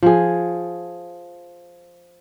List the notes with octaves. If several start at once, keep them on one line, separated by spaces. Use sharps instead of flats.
F3 G#4